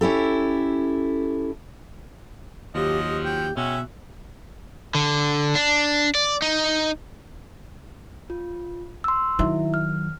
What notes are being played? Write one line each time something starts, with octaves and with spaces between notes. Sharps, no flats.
C#4 E4 G4 A4
D#2 F3 F#3 G4 D#5
G4
G5
B2 G#3 C#4 F#4 E5 G5
D3
D4
D5
D#4
F4
C6 E6
D#3 F#3 E4 E5
F6